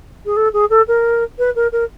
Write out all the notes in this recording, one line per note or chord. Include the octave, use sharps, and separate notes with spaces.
G#4
A4
G#4
A4
A#4
B4
A#4
A#4